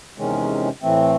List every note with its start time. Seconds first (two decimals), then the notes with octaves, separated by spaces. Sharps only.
0.17 E2 C3 D#3 G#3 C#4
0.82 A2 E3 A3 C4